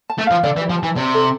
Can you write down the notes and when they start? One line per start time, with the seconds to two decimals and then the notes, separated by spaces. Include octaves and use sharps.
0.10 A5
0.19 A3
0.27 F3 F5
0.44 D3 D5
0.57 E3
0.61 G4
0.70 F3
0.78 E3 A5
0.96 C3 D5
1.14 A4